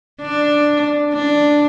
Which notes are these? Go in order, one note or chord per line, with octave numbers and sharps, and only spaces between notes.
D4
D4